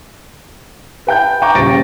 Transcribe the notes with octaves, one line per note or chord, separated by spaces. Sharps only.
B4 G5 G6
G5 A#5 C#6 D6 G6
D#1 C#3 A6 A#6 D7